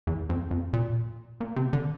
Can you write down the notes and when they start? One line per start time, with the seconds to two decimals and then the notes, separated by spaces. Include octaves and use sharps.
0.07 E2
0.29 F2
0.51 F2
0.73 A#2
1.41 A#2
1.56 C3
1.73 D3